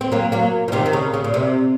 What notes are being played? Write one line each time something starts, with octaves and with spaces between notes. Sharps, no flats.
C4
F#3 A#3
F#3 A#3
F3
C3 D#3
D#3
C#3
C#3
A#2
C3